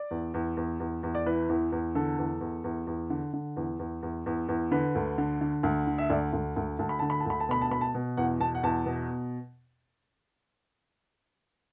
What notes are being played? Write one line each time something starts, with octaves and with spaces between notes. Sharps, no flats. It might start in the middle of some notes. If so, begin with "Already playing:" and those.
Already playing: D5
E2
E2
E2
E2
E2
D5
E3 B4
E2
E2
D3 A4
E2
E2
E2
E2
D3
D3
E2
E2
E2
E2
E2
D3 B4
D2
D3
D3
D2
D3
E5
D2 D5
D2
D2 F#5
D2 A5
B5
D3 A5
B5
A5
D2 B5
A5
B2 B5
A5
B2 B5
A5
B2
E2 F#5
B2 A5
F#5
E2 A5
B2